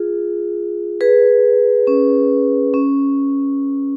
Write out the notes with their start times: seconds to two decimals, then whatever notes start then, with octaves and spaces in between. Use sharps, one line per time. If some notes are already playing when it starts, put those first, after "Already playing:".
Already playing: F4 G#4
1.01 G#4 B4
1.87 C#4
2.74 C#4